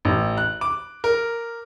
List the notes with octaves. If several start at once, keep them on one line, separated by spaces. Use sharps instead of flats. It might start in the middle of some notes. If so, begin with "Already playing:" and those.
A1
F#6
D6
A#4